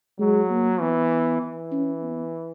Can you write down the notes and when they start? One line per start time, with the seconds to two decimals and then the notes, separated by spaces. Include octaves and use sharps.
0.19 F#3 G#3
0.49 A#3
0.80 E3 B3
1.41 E3
1.71 C#4
2.02 B3